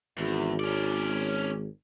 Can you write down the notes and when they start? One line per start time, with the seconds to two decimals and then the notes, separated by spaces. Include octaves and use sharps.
0.18 G#1 E2
0.60 C#4 D5